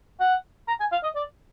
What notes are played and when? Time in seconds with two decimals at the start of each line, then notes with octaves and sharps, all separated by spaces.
0.20 F#5
0.68 A#5
0.80 G#5
0.92 F5
1.03 D#5
1.15 D5